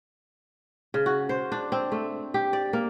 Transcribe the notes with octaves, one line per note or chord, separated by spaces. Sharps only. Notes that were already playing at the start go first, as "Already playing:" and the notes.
C#3
F#4
C5
D4
C4
A3
G4
D5
A#3